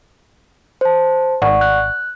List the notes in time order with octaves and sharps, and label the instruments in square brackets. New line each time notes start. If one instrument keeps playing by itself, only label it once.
[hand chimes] C5 A5
[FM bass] G#1 [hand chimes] D5 F#5 C#6
[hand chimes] F#6